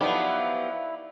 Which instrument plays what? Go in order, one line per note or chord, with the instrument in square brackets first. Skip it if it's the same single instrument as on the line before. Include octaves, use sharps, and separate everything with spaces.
[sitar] F3 F#3 [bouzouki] B3 G4 [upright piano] D#4 D5 B5 [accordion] E4